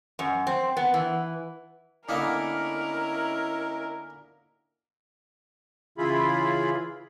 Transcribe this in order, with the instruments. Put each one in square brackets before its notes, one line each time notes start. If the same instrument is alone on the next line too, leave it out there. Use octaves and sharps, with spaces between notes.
[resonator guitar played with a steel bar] F#2
C4
B3
E3
[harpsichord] D3 A#3 B3 [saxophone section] C#4 D#4 E4 [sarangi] A#4
[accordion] C#3 E3 E4 F4 G#4 B5